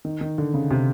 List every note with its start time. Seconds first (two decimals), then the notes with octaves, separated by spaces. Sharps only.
0.05 D#3
0.21 D#3
0.38 D3
0.54 C#3
0.71 C3